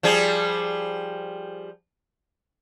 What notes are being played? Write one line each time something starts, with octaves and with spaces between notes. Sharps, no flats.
F3 G3 G#4